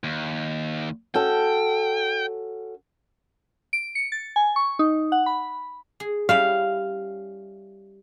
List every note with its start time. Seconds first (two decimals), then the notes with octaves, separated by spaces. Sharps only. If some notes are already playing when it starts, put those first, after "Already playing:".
0.04 D#2
1.15 C#4 F#4 A4 G5
3.73 D7
3.95 C#7
4.12 A6
4.36 G#5
4.56 C#6
4.79 D#4
5.12 F#5
5.26 B5
6.00 G#4
6.29 G3 C#4 E4 F5